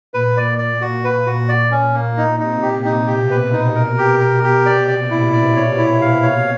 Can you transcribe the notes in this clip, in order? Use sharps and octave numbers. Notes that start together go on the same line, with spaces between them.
A#2 B4
D5
D5
F#4
B4
F#4
D5
C#4
A#2 A#3
D#4
C3 D#4
G4
A#2 D#4
G4
B2
B4
C3
D#4
B2 A#4
G4
A#4
G4
C3 D5
D5
A#2 E4
D5
C#5
E4
F5
C#5